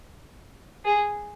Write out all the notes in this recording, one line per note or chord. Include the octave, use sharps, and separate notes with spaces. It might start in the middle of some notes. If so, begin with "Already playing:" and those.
G#4